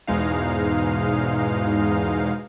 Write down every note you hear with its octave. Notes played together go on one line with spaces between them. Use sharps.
E2 G#2 B2 G#3 D#4 F5